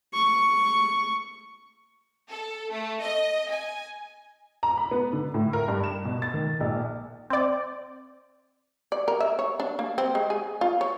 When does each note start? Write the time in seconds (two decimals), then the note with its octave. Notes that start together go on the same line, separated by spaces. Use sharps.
0.14 C#6
2.29 A4
2.70 A3
3.00 D#5
3.50 G#5
4.63 A#5
4.77 B5
4.91 B3
5.13 D3
5.34 A2
5.53 A#4
5.68 G2
5.84 E7
6.05 B2
6.22 A6
6.34 D#3
6.61 A#1
7.30 C4 D5
8.92 D5
9.08 A#4
9.20 E5
9.39 C#5
9.60 D4
9.79 A#3
9.98 C4
10.15 G#3
10.30 G#4
10.61 F4
10.81 C#5